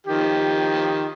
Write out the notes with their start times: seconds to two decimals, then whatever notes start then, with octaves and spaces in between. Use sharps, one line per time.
0.07 D#3 F3 G4